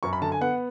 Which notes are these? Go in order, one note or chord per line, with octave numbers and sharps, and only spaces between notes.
F#2 C#6
B5
D3 A5
G#5
B3 F#5